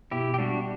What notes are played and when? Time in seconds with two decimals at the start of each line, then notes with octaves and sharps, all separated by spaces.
0.11 B2 E4 G4
0.34 G4
0.38 G3 D4 F#4